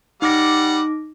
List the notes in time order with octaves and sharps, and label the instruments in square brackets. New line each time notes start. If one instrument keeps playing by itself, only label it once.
[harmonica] G3 F#5 [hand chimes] D#4 D6 A#6